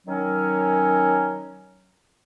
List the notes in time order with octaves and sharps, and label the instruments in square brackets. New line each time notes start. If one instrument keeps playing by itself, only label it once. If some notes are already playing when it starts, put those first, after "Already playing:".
[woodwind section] D#3 F#3 C#4